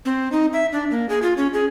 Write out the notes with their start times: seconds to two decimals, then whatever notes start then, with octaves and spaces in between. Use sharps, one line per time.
0.05 C4
0.32 D#4
0.53 E5
0.72 D4
0.91 A#3
1.09 G#4
1.22 F4
1.37 C#4
1.54 G#4